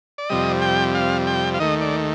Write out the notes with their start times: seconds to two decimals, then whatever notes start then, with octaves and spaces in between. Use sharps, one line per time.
0.18 D5
0.29 F2 C3 G3 D#5
0.62 G5
0.95 F5
1.27 G5
1.54 F5
1.59 D#2 D#3 A3 D#5
1.81 D5